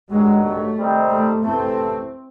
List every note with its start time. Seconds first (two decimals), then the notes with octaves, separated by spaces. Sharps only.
0.10 G2 D#3 F#3 G#3
0.43 A3
0.77 C3 D#3 G3 C4 D#4
1.10 A3
1.42 C3 E3 A3 C4